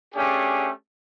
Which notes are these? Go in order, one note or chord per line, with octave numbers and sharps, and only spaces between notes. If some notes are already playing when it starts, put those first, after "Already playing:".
A3 C#4 D4 G4 G#4